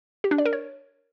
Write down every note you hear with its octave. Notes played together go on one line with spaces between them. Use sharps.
G4
D4
D5
A#4
C#5